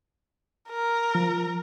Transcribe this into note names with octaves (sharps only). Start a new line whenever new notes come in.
A#4
F3